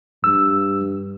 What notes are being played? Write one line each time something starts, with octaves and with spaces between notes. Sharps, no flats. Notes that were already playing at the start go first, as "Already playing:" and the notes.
G2 E6